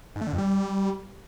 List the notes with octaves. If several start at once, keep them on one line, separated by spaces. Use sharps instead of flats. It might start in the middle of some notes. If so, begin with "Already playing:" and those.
G#2
A3
D3
F2
G3